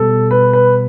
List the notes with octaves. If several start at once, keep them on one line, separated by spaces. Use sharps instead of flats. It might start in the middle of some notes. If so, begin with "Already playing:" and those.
Already playing: B2 G3 A4
B4
B4